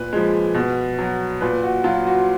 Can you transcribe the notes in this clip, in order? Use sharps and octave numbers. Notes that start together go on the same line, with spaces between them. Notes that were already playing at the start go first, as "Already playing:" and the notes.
Already playing: A#2 B4
F3 G#3
B2
F#3
A#2 B4
F#4
F#3 F4
F#4